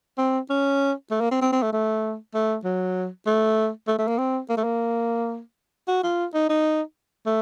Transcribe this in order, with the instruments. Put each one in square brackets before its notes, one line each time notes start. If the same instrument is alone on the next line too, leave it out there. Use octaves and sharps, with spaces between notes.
[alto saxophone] C4
C#4
A3
A#3
C4
C4
C4
A3
A3
A3
F#3
A3
A3
A3
A#3
C4
A#3
A3
A#3
F#4
F4
D#4
D#4
A3